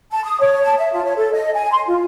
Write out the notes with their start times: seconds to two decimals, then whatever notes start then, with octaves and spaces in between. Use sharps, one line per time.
0.11 A5
0.24 D#6
0.40 C#5
0.64 A5
0.78 E5
0.93 F4
1.05 C#5
1.17 A4
1.33 D#5
1.55 G#5
1.72 C6
1.87 F4